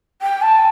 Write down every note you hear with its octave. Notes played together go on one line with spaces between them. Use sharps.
G5
A5